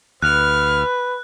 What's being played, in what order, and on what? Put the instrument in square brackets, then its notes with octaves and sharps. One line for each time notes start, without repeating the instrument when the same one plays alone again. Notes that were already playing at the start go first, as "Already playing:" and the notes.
[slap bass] D2 [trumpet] B4 [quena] F6 [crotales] F#6